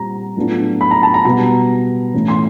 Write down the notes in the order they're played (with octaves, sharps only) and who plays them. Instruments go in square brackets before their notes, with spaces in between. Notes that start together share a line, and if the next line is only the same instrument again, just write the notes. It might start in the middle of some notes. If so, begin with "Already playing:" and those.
Already playing: [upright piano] A#2 G3 C4 A#5
A2 F#3 B3 D4 F4
B5
A#5
A5
A#5
B2 G3 B3 A#5
A2 E3 A3 C#4
C6